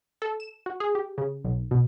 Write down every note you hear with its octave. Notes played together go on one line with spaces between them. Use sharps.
A4
E7
F#4
G#4
G4
C#3
B1
B2